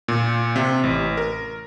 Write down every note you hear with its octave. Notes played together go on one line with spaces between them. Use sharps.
A#2
C3
A1
A#4